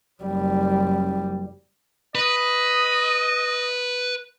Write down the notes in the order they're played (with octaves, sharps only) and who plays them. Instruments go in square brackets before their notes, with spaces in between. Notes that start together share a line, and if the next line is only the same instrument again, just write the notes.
[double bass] F#1 G3
[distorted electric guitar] B4 [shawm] D#5